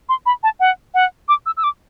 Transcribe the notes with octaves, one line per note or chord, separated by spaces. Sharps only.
C6
B5
A5
F#5
F#5
D6
E6
E6
D6